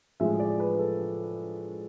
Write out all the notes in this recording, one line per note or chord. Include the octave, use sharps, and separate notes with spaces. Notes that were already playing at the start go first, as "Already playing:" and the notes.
A2 F3 G#3 E5
D5
B4
A4